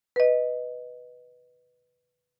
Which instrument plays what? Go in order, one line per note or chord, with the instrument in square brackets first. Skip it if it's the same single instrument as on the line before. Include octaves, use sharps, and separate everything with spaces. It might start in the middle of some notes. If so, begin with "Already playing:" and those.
[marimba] B4 D#5